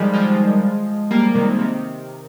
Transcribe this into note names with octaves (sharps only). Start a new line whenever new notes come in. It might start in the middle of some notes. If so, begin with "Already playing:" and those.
Already playing: D#3 F3 G3 G#3
F3 G#3
G3 A#3
C3 D#3
C3 D#3